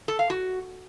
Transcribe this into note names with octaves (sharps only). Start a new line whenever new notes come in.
A4
F5
F#4